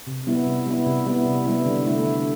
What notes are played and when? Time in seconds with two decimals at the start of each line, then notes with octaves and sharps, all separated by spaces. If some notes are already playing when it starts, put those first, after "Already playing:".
0.07 C3
0.27 G3 B3 E4
0.47 C3
0.66 G3 B3 E4
0.87 C3
1.06 G3 B3 E4
1.25 C3
1.46 G3 B3 E4
1.66 D3
1.85 A3 E4
2.06 D3